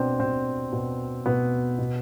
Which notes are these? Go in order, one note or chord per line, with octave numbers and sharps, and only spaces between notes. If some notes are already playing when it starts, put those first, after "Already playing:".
Already playing: B2 C4 D4
B2 C4
B2
B2 B3
B2